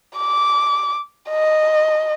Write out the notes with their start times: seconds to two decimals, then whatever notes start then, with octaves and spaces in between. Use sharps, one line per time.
0.17 D6
1.30 D#5